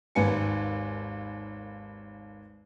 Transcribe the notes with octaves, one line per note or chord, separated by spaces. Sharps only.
G#1 D#2 B4 G#5 C#7